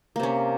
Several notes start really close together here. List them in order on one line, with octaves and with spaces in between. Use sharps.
A#3 C3 C#4